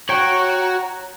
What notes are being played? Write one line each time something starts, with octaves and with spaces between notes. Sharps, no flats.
F#4 C#5 F#5 G5 A#5